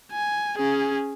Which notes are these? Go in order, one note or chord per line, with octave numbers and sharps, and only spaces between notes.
G#5
C#4 G#4